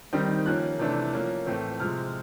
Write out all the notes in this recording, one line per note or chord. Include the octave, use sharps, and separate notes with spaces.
D#3 G3 C4 D#4
F3 A#3 C#4 F#6
C3 E3 A3 D4
F3 A#3 C#4
A2 E3 A3 C4
C3 F3 G#3 F6